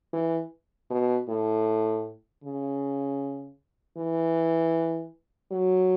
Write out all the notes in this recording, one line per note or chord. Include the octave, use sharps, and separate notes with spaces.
E3
B2
A2
C#3
E3
F#3